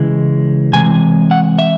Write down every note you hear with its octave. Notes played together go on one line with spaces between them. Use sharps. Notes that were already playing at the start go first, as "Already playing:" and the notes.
Already playing: C#3 E3 G#3
C3 E3 G#3 G#5
F#5
E5